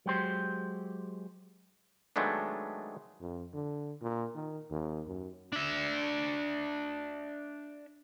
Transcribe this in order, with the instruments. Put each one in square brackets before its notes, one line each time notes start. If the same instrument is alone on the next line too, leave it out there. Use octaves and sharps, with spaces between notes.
[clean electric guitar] F#3 G#3 G4 C5
[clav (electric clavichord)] D#3 F#3 G#3 A3 B3 D4
[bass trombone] F2
D3
A#2
D#3
D#2
F#2
[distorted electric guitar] D4 E5